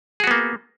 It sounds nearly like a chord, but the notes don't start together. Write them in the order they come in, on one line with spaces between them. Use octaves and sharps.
G#4 F#4 B3 A#3